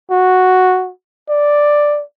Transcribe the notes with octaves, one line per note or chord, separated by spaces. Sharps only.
F#4
D5